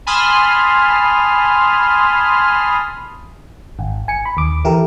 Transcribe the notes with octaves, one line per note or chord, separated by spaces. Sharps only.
G#5 A5 B5 C6 D#6 F6
G#1
G#5 C#7
B5
D#2 D6
E3 E4 G4 A4 A#4